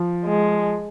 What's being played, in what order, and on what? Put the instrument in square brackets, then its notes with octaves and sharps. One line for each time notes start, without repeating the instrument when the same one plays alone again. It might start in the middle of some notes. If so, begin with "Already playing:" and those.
Already playing: [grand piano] F3
[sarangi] G#3